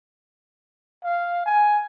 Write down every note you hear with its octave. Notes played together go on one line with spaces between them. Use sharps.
F5
G#5